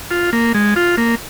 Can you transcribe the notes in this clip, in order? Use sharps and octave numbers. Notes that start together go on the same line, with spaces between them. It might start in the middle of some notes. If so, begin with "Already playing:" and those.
F4
A#3
G#3
F4
A#3